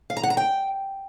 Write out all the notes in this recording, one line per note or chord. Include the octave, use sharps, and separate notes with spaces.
F5
A#5
F#5
A#5
G5